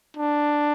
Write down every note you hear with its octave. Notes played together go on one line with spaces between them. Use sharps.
D4